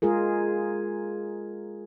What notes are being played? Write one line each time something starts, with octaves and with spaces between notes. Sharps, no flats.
G#3 F4 G#4 A#4